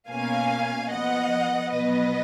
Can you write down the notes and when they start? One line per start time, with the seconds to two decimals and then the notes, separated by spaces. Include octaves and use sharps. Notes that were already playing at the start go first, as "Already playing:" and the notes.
0.10 B2 A#3 C#4 F5 G#5
0.90 F3 B3 D#5 F#5
1.71 B2 F#3 B3 B4 D#5